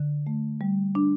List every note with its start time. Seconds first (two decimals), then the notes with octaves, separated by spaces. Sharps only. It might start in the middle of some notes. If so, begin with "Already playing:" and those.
Already playing: D3
0.27 A3
0.61 G3
0.95 D4